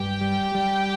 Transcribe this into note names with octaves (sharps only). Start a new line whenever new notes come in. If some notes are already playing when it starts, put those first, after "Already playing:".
Already playing: G2 G4 G5
G3
G3